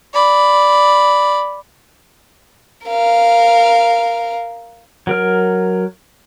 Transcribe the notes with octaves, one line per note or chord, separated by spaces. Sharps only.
D5 B5
A#4 F5
F#3 A#4 F6